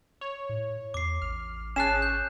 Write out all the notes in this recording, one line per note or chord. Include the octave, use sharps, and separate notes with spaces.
C#5
A2
E2 D6 C7
A1 F6
G#1 C#4 G#4 A5 F#6 C7 E7
G6